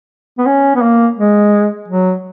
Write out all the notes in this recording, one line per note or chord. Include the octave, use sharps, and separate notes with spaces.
B3
C#4
B3
A#3
G#3
F#3